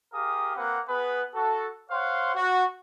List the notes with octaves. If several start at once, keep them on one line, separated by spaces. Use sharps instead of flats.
G4 G#4 A#4 F5 D#6
A#3 C4 B4 F#5
B3 G#4 B4
F#4 A4
C5 C#5 F5 F#5 C6
F#4